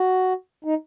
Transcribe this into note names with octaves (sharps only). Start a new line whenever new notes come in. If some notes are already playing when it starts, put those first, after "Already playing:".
Already playing: F#4
D#4